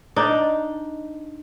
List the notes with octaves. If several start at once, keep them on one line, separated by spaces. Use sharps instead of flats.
D4 D#4